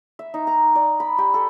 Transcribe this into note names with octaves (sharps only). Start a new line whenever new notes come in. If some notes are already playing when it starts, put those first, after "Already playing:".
E5
D#4
A#5
D5
B5
G4
A4